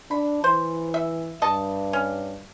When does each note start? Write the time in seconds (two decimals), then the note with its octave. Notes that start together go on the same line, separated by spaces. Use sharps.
0.11 D4 B5
0.44 E3 C5
0.94 E5
1.42 G2 D#5 A5
1.93 C#4